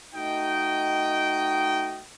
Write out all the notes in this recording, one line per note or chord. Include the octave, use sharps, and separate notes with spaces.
A3 D#4 F#4 D#5 G5